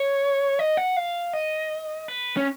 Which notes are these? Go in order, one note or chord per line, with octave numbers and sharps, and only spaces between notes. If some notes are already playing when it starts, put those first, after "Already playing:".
Already playing: C#5
D#5
F#5
F5
D#5
B4
C#4